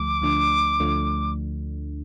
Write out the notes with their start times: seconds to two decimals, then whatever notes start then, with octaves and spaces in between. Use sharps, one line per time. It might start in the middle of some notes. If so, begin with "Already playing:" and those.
Already playing: D2 D3 F3 A3 D6
0.22 D2 D3 F3 A3 D4
0.80 D2 D3 F3 A3 D4